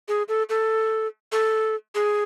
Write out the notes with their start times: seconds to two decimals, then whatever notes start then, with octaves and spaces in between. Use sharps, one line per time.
0.08 G#4
0.29 A4
0.49 A4
1.32 A4
1.95 G#4